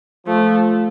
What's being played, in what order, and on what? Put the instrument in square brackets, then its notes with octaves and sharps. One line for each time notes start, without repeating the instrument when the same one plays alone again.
[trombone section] F3 [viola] A3